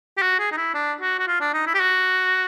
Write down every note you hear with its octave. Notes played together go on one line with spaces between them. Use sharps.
G4
F#4
G#4
D#4
E4
D4
F#4
F#4
F4
D4
D#4
E4
G4
F#4